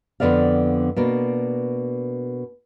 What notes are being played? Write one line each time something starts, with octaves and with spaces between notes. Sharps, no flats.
F2 D3 G#3 B3 D5 F5
B2 A#3 D4